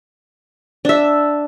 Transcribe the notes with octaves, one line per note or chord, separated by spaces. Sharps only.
D4 E5